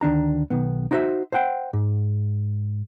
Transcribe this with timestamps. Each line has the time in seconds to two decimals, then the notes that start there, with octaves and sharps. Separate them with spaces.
0.01 D2 D#3 D4 A#5
0.50 B1 D#3 B3
0.91 D#4 E4 F#4 C5 E5
1.32 C5 E5 F#5 G5
1.73 G#2